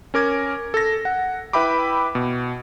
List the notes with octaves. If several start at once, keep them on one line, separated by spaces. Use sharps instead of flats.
C#4 A#4 D6 G#6
A4 A#6
F#5
E4 B4 E5 G5 B5 D6
B2